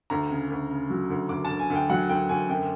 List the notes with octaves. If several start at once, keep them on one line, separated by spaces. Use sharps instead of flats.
D2 A#5
C#3
D2
C#3
F#3
D2
D2 D6
D2 A5
G#5
D2
G5
F#3 F#5
D2 G5
D2 G#5
F#2 G5